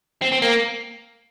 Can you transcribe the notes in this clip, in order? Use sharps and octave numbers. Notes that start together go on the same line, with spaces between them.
C4
C4
A#3